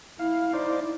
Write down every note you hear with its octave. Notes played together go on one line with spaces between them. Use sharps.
E4 F5
D#4 C5 D5